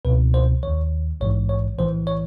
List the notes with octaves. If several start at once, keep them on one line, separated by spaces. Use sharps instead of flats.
C#2 B2 B4
C5
D#2 D#3 C#5
A#1 G#2 E3 C#5
C#5
B1 A2 E3 C5
C#5